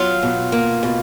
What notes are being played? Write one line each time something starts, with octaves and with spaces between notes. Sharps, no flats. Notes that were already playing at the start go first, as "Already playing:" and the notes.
Already playing: F#3 F4 F5
B2
A#3
B2